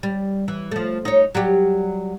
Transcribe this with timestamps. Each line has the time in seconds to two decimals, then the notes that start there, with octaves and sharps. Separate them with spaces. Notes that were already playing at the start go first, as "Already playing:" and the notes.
0.03 G3
0.48 E3
0.71 F3 A3
1.05 D#4 C#5
1.35 F#3 G3 G4